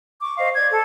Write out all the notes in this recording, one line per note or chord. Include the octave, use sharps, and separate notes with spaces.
C#6 D6
C5 D#5 F5
D5 G#6
A4